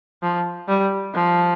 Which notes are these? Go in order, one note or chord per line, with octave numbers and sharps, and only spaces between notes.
F3
G3
F3